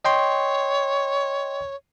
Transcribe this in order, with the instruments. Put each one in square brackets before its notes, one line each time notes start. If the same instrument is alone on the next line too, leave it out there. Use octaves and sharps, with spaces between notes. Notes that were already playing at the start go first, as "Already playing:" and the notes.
[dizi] C#5 [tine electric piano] D#5 G5 C6